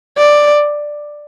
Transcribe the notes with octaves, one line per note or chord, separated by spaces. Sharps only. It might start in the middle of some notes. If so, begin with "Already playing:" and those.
D5